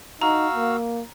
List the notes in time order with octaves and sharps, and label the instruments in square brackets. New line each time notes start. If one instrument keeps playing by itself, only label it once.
[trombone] D#4 [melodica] F#4 F5 E6 [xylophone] A#5
[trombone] A#3